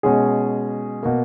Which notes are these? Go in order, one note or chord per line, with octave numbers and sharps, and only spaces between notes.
B2 G#3 C#4 G#4
B2 A#3